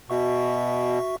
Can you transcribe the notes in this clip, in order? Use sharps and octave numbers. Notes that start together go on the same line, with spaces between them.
B2 F#4 E5 C#6